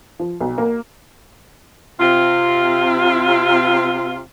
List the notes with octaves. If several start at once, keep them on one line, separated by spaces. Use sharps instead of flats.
F3
B1
A#3
C3 F4